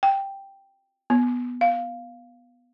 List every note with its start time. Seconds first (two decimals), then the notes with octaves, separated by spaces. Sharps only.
0.03 G5
1.10 B3
1.61 F5